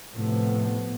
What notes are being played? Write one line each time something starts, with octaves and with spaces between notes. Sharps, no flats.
A2 C3 F3 A3 B3